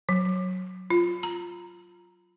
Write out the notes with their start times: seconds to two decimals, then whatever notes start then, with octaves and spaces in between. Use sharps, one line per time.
0.09 F#3
0.90 F4
1.23 A#5